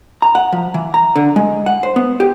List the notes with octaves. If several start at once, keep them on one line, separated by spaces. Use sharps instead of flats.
A#5
F#5
F3
E3
A#5
D3
G#3
F#5
C5
B3
G4